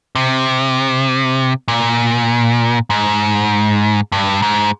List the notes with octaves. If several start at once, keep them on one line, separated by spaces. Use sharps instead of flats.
C3
A#2
G#2
G2
G#2